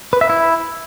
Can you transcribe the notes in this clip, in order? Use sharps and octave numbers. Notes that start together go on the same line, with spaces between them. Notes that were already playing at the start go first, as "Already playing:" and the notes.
B4
E5
E4